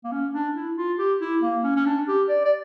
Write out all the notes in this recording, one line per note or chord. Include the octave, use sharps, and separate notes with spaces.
A#3
C#4
D4
E4
F4
G4
E4
A#3
C#4
C#4
D4
G4
D5
D5